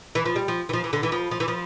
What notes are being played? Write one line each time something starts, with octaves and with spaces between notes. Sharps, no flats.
E3
F3
G3
F3
E3
F3
E3
D3
E3
F3
F3
E3
F3